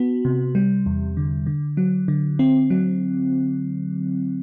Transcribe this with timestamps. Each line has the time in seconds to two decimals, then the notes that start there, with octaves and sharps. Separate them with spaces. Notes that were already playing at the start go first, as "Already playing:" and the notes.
Already playing: B3 F#4
0.25 C3
0.55 G3
0.86 E2
1.17 D3
1.47 D3
1.77 F#3
2.08 D3
2.39 C4
2.70 F#3